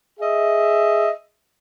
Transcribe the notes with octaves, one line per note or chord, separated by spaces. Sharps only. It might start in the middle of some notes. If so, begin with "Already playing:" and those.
G#4 D#5 E5